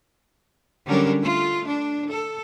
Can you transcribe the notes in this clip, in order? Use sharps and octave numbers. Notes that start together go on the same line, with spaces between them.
D3 F#3 G3 C#4 D4 A#4
A3 F4
D4
A4